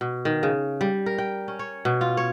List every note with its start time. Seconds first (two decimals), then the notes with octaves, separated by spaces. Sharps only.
0.01 B2
0.25 D#3
0.43 C#3
0.81 G3
1.06 A#4
1.18 G5
1.48 C#4
1.59 C#5
1.85 B2
2.01 F4
2.17 C#5